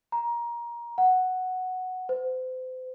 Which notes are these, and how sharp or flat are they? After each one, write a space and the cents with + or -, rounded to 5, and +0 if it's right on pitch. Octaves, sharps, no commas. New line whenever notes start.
A#5 +20
F#5 +0
C5 -35